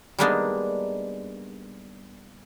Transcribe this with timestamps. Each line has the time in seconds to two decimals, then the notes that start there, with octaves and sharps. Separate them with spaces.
0.19 G3 G#3 A#3 B3 D4 D#4